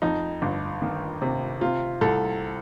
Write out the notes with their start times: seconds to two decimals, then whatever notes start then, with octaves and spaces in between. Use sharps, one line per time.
0.02 F2 D#4
0.42 G1
0.82 D#3
1.22 C3
1.61 C3 F4
2.01 C2 A4